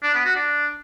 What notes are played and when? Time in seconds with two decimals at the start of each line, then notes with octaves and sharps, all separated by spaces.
0.03 D4
0.14 B3
0.25 F#4
0.36 D4